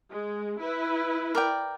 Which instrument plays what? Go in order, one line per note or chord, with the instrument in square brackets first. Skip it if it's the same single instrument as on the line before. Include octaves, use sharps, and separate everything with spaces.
[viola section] G#3
E4 B4
[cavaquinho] A#4 D5 G5